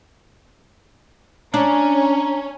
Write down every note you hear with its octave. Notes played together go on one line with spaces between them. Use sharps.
C#4 D4 A#5